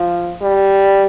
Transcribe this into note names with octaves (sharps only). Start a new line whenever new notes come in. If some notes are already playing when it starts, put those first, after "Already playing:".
Already playing: F3
G3